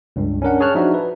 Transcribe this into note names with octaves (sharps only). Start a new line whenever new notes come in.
C#2 G2
C#4 D4 A#4 F#5
G#4 C#5 A5 F6 F#6
F3 D4 D#4 F#4 E5
B4